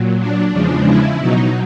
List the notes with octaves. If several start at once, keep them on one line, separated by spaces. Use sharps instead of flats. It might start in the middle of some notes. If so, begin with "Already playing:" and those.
Already playing: A#2 F#3
D4
E2 C#3 F3 G#3
E4
B2 F#3 D#4